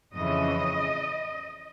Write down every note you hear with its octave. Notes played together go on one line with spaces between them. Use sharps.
F2 C#3 E3 D#5